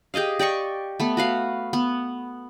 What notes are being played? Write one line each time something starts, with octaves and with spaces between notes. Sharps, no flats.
G4 G#4 D#5 F5
G4 D5 D#5 C#6
A3 B3
F#4 B4 F5
B3